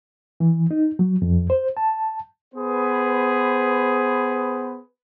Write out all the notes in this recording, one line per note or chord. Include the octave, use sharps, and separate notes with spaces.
E3
D#4
F#3
F2
C5
A5
B3 G#4 B4 C5